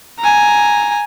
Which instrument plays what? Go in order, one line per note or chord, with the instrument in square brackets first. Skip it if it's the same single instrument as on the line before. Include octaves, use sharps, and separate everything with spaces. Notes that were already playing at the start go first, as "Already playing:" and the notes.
[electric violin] G#5 A#5